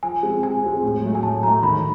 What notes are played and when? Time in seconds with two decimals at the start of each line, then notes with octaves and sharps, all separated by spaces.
0.03 F3 G#5
0.23 G#3 C4
0.43 F3 G#5
0.63 G#3 C4
0.83 A2
1.03 F#3 A3
1.15 G#5
1.23 A2 A5
1.43 F#3 A3 A#5
1.63 D#3 B5